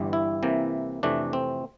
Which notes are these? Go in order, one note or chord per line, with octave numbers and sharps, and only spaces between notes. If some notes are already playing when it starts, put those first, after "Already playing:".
Already playing: G1 G2 E3 G3
E4
C2 C3 E3 A#3
F2 C3 E3 A3 D4
C4